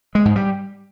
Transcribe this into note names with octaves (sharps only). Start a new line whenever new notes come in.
G#3
G#2
G3